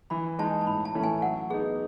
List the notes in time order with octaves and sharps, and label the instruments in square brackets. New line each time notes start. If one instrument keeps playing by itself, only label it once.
[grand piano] E3 [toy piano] B5
[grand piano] G#3 D#4 [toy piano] A5
[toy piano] A5
[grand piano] A2 [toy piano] B5
[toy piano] A5
[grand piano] E3 A3 C#4
[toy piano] G#5
[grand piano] F#3 [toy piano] F#5
[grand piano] B3 D#4 [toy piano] G#4